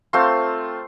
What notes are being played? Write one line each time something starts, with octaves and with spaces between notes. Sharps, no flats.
A3 C4 F4 C6